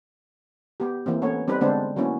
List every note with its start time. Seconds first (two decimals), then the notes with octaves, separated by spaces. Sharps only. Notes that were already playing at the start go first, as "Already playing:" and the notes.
0.80 B3 G4
1.06 E3 A#3 C4
1.22 A3 B3 C#4 C#5
1.48 G3 C4 D#4 B4
1.61 D3 G#3 B3 C4 D4 C5
1.96 F#3 A#3 B3 C#4 E4